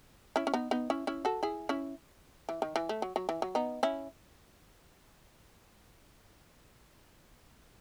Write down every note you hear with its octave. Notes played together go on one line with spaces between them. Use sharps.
C#4 E4
C#4
B3 D#4
B3 D#4
C#4 E4
C#4 E4
F#4 A4
E4 G#4
C#4 E4
E3
D#3
E3
A3
F#3
F#3
E3
F#3
B3 D#4
C#4 E4